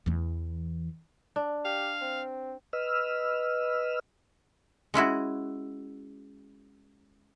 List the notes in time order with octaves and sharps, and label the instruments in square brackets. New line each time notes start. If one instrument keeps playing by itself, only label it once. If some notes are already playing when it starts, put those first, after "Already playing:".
[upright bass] E2 E3
[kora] D4
[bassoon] G4 [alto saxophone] F5
[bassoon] C4
[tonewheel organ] B4 D#5 E6 F6
[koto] G#3 C#4 E4 F#4